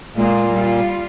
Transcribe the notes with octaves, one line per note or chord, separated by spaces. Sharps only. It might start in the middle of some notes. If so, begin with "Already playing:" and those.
A#2 G#3 A#3 F4
G3 F4